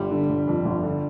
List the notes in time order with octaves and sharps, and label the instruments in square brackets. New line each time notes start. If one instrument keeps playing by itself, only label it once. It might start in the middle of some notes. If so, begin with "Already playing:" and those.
Already playing: [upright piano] G1 [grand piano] G3 G4
[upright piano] D3
G1
F2
G1
D3